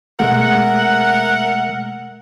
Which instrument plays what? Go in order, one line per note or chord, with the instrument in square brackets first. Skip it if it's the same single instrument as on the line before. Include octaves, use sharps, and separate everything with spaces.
[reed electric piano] B2 G#3 A3 [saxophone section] A#4 E5 F#5